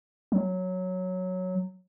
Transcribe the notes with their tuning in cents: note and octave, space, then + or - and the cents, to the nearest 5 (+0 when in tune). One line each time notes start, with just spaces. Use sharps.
F#3 -5